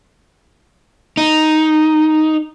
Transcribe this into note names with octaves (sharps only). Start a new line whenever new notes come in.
D#4